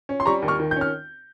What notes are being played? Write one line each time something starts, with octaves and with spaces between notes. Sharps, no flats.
C#4
C6
G3 A#5 C#6
D#2
C#6 F6
D#3
C#4 G6
F6